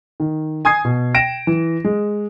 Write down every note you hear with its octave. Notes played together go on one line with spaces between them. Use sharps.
D#3
G#5 D#6 G#6 C7
B2
G5 A#6 D7 E7
E3
G#3